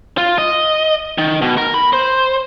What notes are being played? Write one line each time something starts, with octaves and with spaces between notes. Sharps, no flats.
F4
D#5
D#3
B2
A#4
B5
C5